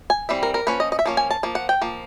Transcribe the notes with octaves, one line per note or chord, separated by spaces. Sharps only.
G#5
E3 G3 C4 E5
A#4
A#4
F3 A#3 C#4 B4
D#5
D#5
E5
F3 A#3 C#4
G#5
A5
F3 A#3
F#5
G5
F3 A#3